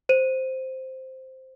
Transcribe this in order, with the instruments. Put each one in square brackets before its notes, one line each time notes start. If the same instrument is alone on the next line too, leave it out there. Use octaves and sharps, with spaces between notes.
[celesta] C5 D#7